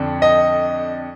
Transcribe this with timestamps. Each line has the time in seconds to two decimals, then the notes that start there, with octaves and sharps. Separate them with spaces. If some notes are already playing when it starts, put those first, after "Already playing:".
Already playing: F2 D3 D4
0.22 D#5